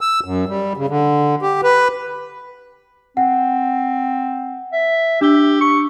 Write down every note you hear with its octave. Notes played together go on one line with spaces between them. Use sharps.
E6
F#2
G3
C#3
D3
G4
B4
C4 F#5
E5
D4 G4 E6 G7
C#6